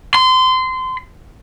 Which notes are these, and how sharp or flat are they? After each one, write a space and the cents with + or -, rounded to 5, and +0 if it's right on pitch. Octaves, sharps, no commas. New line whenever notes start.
C6 -25